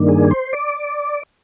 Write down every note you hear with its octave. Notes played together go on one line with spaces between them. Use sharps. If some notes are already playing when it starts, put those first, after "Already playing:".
Already playing: G2 D#3 A#3 D4
G#4
C5
D5